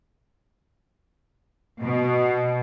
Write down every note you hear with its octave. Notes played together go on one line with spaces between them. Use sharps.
B2